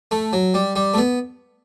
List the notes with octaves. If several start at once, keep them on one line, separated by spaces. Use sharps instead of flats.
A3
F#3
G3
G3
A3
B3